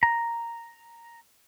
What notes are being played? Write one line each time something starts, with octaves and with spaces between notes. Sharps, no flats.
A#5